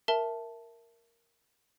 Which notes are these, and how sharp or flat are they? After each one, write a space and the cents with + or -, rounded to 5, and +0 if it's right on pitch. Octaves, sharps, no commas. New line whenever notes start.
A#4 +0 E5 +5 A5 +0